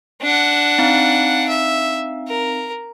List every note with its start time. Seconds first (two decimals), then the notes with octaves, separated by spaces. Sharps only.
0.22 D4 F#5
0.78 C4 D#4 F5
1.49 E5
2.28 A#4